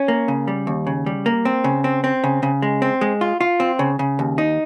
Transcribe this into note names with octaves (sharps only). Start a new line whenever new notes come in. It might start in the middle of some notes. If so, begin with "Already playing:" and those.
Already playing: C#4
A#3
C#3
G3
D#2
C#3
G3
A#3
C4
C#3
C4
C4
C#3
C#3
G#3
C4
G#3
F4
F4
C4
C#3
C#3
D#2
D#4